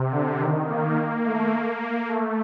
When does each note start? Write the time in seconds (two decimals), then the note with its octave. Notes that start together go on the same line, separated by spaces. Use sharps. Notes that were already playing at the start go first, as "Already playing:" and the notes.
Already playing: C3
0.12 D3
0.40 D#3
0.68 A#3
1.25 A3
1.53 A#3
1.81 A#3
2.08 A3